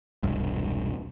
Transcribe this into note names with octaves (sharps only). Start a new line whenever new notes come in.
E1 C2 G2